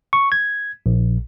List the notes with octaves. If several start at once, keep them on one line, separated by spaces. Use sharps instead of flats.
C#6
G#6
A#1